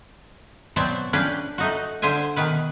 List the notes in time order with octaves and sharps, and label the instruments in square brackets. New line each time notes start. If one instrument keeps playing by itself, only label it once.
[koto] B2 F#3 C4 D5 E5 G5
C#4 D4 B4 G5
A3 D#4 F#4
D3 C5 E5 G#5
B2 D#3 B4